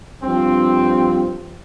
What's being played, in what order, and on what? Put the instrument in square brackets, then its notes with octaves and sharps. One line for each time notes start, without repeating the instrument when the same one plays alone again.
[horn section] G2 F3 C4